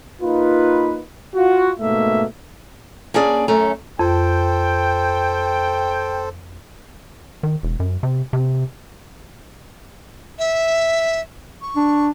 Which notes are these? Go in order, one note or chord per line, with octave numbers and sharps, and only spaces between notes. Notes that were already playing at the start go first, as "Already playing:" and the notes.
A#3 D#4 F4 B4
F4 F#4
G#2 B2 A3 A#3 E5
A#3 C#4 D4 G#4 D5
F#2 A3 C#4 A#5
F2 A4 C5 G5
D#3
E1
F#2
C3
C3
E5
C#6
D4